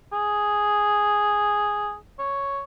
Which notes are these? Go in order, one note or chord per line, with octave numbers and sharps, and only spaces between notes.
G#4
C#5